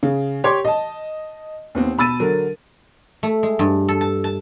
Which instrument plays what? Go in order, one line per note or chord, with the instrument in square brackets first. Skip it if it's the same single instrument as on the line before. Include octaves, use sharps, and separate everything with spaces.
[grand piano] C#3
G4 C#5 C6 D6
D#5 A5
D#2 B3 C4
B2 B5 E6 A6 D#7
D3 F#3 A#4
[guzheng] A3
G#3
G2
A4
A5
A5